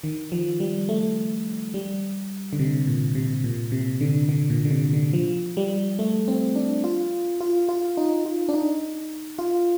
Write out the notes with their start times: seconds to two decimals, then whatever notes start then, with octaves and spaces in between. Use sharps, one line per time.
0.04 D#3
0.32 F3
0.60 G3
0.89 A3
1.74 G3
2.53 D3
2.59 C3
2.87 A#2
3.15 C3
3.44 A#2
3.72 C3
4.01 D3
4.29 D3
4.50 A#2
4.65 D3
4.71 C3
4.93 D3
5.13 F3
5.57 G3
5.99 A3
6.28 C4
6.55 D4
6.84 F4
7.41 F4
7.69 F4
7.97 D#4
8.25 F4
8.49 D4
8.54 D#4
9.39 F4